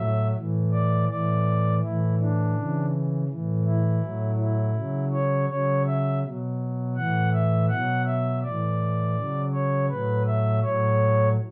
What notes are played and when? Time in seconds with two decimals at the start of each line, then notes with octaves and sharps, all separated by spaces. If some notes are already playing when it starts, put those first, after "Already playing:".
Already playing: A2 F#3 E5
0.35 A2 E3
0.72 D5
1.09 A2 E3 D5
1.82 A2 E3 E4
2.19 D4
2.56 C#3 E3
3.28 A2 E3
3.65 E4
4.02 A2 F#3
4.39 E4
4.75 C#3 F#3
5.12 C#5
5.49 C#3 F#3 C#5
5.86 E5
6.23 B2 F#3
6.96 A2 E3 F#5
7.33 E5
7.69 B2 F#3 F#5
8.06 E5
8.43 A2 E3 D5
9.16 C#3 F#3
9.53 C#5
9.90 A2 F#3 B4
10.26 E5
10.62 A2 F#3 C#5